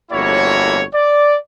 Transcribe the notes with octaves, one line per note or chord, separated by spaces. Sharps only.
G1 F2 A#3 E4 F#4 C#5
D5